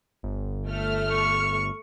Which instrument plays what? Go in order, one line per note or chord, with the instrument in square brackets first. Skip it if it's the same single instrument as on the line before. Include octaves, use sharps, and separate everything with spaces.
[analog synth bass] G1
[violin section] A3 F6
[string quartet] C#6